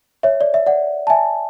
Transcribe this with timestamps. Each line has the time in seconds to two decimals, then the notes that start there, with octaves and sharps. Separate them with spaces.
0.23 C#5 E5
0.41 D5
0.54 E5
0.66 D5 F#5
1.07 A5
1.10 E5 G#5